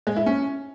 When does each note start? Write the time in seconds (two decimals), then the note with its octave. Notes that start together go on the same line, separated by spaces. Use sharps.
0.07 G#3
0.17 E4
0.26 C#4